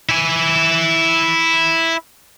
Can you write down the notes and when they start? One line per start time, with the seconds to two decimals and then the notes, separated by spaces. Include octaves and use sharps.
0.09 E4 G#5